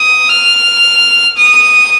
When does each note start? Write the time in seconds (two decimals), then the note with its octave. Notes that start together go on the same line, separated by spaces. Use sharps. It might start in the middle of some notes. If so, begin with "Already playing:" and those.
Already playing: D#6
0.29 F6
1.38 D#6